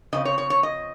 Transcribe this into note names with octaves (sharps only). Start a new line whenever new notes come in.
C#3 F3 C4 D#5
C#5
C#5
C#5
D#5